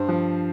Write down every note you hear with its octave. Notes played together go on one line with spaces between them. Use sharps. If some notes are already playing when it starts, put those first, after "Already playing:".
Already playing: G2 C5
F3